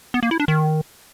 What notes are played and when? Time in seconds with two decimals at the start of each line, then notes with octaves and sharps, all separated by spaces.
0.14 B3
0.23 A#3
0.31 E4
0.40 D4
0.48 D#3